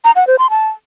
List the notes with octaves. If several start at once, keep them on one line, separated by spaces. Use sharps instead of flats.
A#5
F#5
C5
C6
A5